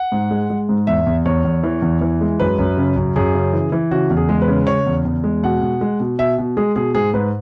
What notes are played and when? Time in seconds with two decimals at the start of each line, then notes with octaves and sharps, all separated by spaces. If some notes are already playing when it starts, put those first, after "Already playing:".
Already playing: F#5
0.12 G#2
0.31 G#3
0.50 G#3
0.69 G#2
0.87 E2 E5
1.06 E2
1.26 E2 C#5
1.45 E2
1.63 E3
1.82 E2
2.01 E3
2.21 G#3
2.39 F#2 B4
2.59 F#2
2.77 C#3
2.96 F#2
3.16 F#2 G#4
3.34 C#3
3.53 E3
3.72 E3
3.91 C#3 F#4
4.10 E2
4.17 G#4
4.29 G#3
4.42 B4
4.48 C#3
4.67 C#3 C#5
4.86 E2
5.05 E2
5.24 G#3
5.43 B2 F#5
5.62 B2
5.81 G#3
6.00 B2
6.18 B2 E5
6.38 B2
6.57 G#3 G#4
6.76 B2 G#4
6.95 G#2 G#4
7.14 G#2 B4